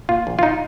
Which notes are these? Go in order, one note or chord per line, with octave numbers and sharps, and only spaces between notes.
A#2 F4
A#1
F4
D#4